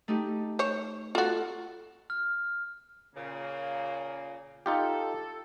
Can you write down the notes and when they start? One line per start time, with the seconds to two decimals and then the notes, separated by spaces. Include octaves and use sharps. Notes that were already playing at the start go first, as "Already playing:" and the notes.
0.08 A3 D#4 G4
0.59 C5 C#5
1.15 F4 F#4 A4
2.10 F6
3.15 A#2 C#3 A#3
4.66 D#4 F4 G4 A4